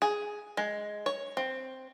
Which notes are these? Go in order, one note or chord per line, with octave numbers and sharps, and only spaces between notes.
G#4
G#3
C#5
C4